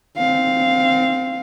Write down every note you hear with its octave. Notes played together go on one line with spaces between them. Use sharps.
C4 F5